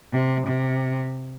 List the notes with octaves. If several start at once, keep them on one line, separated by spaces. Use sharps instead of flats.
C3
C3